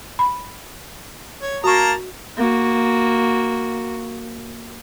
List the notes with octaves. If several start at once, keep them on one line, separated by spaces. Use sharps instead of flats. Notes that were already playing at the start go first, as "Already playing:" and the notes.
B5
C#5
A#3 F#4 A5 A#5 C#6
A#3 F#4